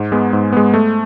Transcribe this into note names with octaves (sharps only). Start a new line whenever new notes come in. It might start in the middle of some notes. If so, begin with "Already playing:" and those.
Already playing: G#2
G#3 B3
G#2
G#3 B3
A3